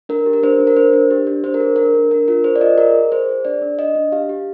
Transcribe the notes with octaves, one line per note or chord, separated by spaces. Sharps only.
D4 A#4
G4
A#4
D4 C5
D4
A#4
D4 C5
D4
G4
D4
D4 C5
A#4
G#4
D4 A#4
D4
D4 A#4
F4 A#4
G#4 C5
D5
F4 D#5
G#4 A#4
G#4
G#4 C5
G#4
D4 D5
D4
D4 D#5
D4
G4 F5
G4